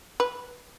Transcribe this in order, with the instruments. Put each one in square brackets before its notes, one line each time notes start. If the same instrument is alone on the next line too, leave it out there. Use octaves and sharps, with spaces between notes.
[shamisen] B4